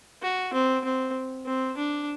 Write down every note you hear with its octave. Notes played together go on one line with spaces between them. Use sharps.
F#4
C4
C4
C4
D4